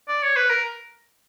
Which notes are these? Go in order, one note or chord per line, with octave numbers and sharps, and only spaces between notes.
D5
C#5
B4
A#4